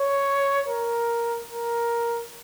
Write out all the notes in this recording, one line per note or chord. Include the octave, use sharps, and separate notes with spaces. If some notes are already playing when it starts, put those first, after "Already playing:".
Already playing: C#5
A#4
A#4